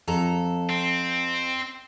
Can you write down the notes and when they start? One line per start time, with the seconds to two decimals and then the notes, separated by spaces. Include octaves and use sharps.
0.07 F2 A4 A#5
0.70 C4